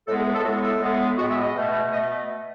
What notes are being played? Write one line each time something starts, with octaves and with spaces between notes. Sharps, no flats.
A2 G#3 B3 A4
G#4
B4
A4
A2 G#3 B3 F#4
A4
A2 G#3 B3
A2 G#3 B3 F#4
E5
D#5
B2 A3
B2 A3 D#5